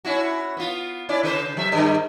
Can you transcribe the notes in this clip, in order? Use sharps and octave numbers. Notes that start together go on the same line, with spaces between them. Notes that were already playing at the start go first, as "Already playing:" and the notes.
C#4 E4 F#4
B3 F4
C#4 E4 D5
C#3 B4 C5
F#3 E5
G2 D#3 G3